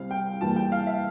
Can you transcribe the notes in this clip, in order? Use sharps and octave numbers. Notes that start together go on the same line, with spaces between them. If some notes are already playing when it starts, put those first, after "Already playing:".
Already playing: C2 C3 G3 C4 F5
G5
E2 E3 G3 A#3 A5
G5
F5
E5